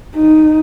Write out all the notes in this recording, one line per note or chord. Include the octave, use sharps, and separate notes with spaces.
D#4